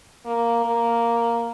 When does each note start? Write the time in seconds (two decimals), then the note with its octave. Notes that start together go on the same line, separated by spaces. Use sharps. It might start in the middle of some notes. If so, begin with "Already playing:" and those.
0.26 A#3
0.65 A#3